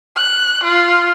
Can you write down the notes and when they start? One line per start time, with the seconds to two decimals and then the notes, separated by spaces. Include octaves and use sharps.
0.16 F#6
0.64 F4